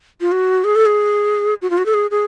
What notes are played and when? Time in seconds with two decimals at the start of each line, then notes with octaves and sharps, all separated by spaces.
0.21 F4
0.32 F#4
0.64 G#4
0.76 A4
0.86 G#4
1.62 F#4
1.70 F4
1.78 F#4
1.86 A4
1.94 G#4
2.11 G#4